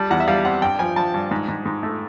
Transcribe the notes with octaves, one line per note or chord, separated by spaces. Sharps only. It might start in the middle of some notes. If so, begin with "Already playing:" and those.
Already playing: G3 A5
E2 F#5
E5
G3 F5
C4 F#5
G2 G5
F3 G#5
F3 A5
G2
G#2
G#2
G#2
A3